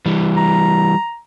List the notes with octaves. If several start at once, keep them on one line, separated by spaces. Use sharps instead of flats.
E3 G3
A#5